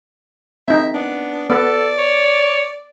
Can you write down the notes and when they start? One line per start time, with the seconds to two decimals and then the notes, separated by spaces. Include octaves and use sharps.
0.68 C4 D#4 E5
0.94 B3 D4
1.50 B3 A4 B4 D5
1.98 C#5